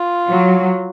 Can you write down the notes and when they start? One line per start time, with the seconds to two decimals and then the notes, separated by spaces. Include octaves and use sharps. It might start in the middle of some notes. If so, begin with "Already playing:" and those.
Already playing: F4
0.30 F#3